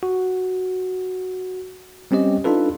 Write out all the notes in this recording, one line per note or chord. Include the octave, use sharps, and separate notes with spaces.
F#4
G3 C4 C#4 G4 D#5
D4 D#4 F4 A4 B4